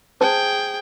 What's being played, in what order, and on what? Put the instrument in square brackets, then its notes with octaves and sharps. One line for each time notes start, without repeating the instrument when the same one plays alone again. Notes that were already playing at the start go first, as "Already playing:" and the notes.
[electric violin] G#4 G5 [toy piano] C5 A5